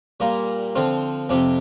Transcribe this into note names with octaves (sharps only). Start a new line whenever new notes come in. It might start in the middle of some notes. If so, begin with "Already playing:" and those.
A#2 G3 A#3 F4
D3 F3 C4 F4
F2 C3 G3 C4 G4